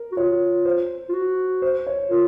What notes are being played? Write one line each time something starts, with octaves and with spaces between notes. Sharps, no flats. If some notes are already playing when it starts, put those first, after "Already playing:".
Already playing: A#4
F#4
F4 C#5
C5
F4
F#4
C5
C#5
F4 A#4